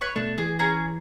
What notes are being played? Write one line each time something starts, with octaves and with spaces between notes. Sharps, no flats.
B4 C#5 C#6
B2 A3 D4
E3 G#4
C#4 G#4 A#5